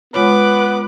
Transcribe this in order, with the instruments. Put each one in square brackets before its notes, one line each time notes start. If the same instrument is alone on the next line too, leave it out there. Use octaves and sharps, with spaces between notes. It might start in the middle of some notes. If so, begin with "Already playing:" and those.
[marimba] G#3 F4 C#5 [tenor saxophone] B3 [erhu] B4 [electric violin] D6